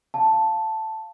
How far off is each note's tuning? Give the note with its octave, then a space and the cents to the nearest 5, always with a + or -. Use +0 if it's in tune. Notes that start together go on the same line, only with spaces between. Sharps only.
F5 +0 A5 +0